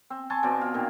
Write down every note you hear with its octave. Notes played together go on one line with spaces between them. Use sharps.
C4
G#5 A5 C6 C#6
B2 C4 D5
F4
A#2 D#3